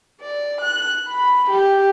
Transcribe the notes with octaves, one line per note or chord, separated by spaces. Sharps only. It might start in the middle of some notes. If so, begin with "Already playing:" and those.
D5
F#6
B5
G4